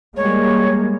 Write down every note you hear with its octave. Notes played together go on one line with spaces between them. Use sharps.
G3 G#3 A#3 C#5